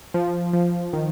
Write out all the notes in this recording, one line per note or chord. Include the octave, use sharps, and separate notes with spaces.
F3
F3
D#3